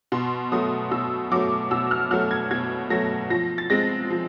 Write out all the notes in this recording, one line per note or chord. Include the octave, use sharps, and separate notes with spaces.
B2 C6
F#3 A3 D#6
B2 E6
F#3 A3 D6
B2 E6
F6
F#3 A3 F6
G#6
B2 G#6
F#3 A3 A#6
F3 A#6
A6
G#3 C4 A#6
F3